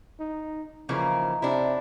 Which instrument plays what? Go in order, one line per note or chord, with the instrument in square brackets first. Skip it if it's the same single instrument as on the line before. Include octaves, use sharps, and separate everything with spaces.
[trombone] D#4
[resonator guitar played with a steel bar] C#3 E3 A#3 [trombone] F3 [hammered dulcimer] D#4 F5
[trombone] C3 [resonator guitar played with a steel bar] D4 E4